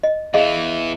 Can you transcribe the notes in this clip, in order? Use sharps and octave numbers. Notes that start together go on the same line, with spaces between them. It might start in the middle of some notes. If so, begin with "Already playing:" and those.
D#5
E2 E3 G#4 D#5 F5